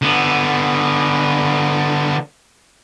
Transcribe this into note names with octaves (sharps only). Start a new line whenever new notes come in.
D3 B3